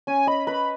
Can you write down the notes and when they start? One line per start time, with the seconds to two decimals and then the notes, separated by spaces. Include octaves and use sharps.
0.07 C#4 G#5
0.27 D#5 B5
0.47 B4 B5